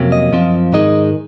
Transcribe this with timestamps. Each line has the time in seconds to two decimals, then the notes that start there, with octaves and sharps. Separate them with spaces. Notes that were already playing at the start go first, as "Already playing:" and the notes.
Already playing: F2 C3 F#3 A#3 C#4
0.12 D#5
0.32 F#2 F3 C4 F4
0.73 G#2 D#3 G#3 D#4 D#5